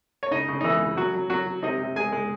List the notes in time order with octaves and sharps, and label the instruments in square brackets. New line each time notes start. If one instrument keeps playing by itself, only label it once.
[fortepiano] C#5
C#3 D#4 D#5
C#3
D#4
E3 G#3 E4
C#3
F#3 F#4
F#3
F#3 F#4
F#3
C3 D#4 D#5
C3
G#3 G#4 G#5
G#3